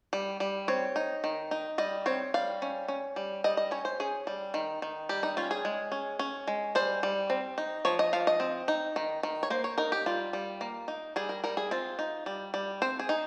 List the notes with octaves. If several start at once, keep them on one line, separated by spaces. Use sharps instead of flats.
G3
G3
C4 C#5
D#4
D#3
D#4
G3 D#5
C4 C#5
G3 F5
C#4
C#4
G3
G3 D#5
D#5
C#4 C#5
C5
C#4 G#4
G3
D#3
D#3
G3 G4
D#4
C#4 F4
G#4
G#3
C#4
C#4
G#3
G3 C5
G3
C4
D#4
F3 C#5
D#5
F3 F5
D#5
C4
D#4
D#3
D#3
C#5
A#3 C5
C#5
D#4 A#4
G4
G3 F4
G3
A#3
D#4
G3 G#4
A#4
G3 A#4
G#4
C4 F4
D#4
G3
G3
C4 C5
G#4
D#4